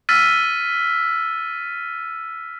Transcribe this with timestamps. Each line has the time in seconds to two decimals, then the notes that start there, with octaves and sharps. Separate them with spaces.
0.09 E6 F6 A6 B6 D#7